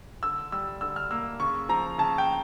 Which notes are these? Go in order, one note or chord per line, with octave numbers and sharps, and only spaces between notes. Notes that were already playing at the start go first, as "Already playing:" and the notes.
D3 E6
G3 E6
D3 E6
F6
A#3 E6
C#3 C#6
F3 A#5
C#3 A5
G5